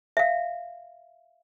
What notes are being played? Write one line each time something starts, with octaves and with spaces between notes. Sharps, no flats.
E5 F5